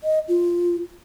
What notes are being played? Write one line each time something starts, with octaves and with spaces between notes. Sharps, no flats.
D#5
F4